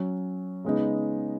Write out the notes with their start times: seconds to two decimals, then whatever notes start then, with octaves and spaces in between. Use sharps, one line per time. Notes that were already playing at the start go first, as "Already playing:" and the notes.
Already playing: F#3 C#4 F#4
0.64 C#3 G#3 B3 D#4